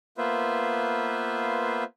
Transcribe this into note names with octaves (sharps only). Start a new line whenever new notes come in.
A#3 B3 F4 B4 C5 E5